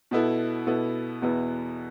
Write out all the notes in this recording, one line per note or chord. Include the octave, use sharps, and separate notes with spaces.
B2 B3 E4 A4
B2 B3 E4 A4
E2 B2 B3 E4